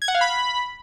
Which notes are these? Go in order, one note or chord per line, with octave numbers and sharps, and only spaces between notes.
G#6
F#5
F5
B5